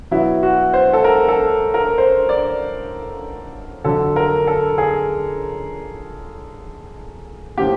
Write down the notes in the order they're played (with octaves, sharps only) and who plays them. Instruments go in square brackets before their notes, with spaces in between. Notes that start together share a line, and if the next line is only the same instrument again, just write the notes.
[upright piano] B2 F#3 B3 E4
F#4
C5
A4
A#4
A4
A#4
C5
D5
F2 D3 F#3 A4
A#4
A4
G#4
A2 F3 A#3 G4